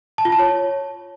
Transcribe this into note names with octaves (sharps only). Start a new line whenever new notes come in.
A5
F4
A5
C#5